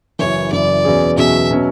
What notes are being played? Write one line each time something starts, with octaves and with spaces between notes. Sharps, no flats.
F#1 F#2 E3 C#5
F#1 F#2 E3 D5
E2 B2 F#3 C#4 G#4
E2 B2 F#3 C#4 G#4 E5
B2 F#3 C#4